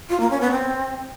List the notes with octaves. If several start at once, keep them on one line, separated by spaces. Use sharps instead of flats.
F4
A#3
C#4
B3
C4